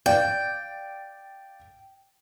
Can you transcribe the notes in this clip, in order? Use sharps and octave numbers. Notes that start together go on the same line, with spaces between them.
D5 F5 G5